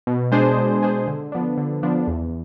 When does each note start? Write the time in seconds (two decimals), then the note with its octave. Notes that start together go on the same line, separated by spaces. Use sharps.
0.07 B2
0.32 G#3 D4 G#4 C5
0.57 B2
0.83 G#3 D4 G#4 C5
1.07 D3
1.32 F3 B3 D4
1.57 D3
1.83 F3 B3 D4
2.07 E2